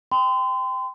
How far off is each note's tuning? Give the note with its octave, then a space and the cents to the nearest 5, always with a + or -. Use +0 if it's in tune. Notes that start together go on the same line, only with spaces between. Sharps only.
G5 +0 C6 -35